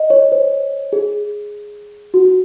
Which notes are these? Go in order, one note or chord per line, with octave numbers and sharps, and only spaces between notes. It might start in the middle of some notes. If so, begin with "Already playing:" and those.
Already playing: D#5
C#5
C5
G#4
F#4
F#4